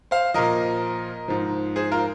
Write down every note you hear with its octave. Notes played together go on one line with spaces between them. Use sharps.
C5 F5
A#2 F3 A#4 D#5
G#2 F3
G#4 C5
F4 A#4